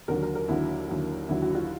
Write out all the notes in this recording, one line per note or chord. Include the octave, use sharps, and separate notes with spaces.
D#2 D3 F#3 A#4
A#4
A#4
D#2 D3 F#3 E4
D#2 D3 F#3
D#2 D3 F#3 E4
F#4
E4
F4